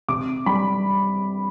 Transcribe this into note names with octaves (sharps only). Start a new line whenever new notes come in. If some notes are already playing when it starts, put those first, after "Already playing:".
C3 D6
G3 B5